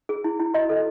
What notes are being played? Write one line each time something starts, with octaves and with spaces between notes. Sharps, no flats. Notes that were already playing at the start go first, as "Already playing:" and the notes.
G#4
E4
E4
F#4 D#5
A4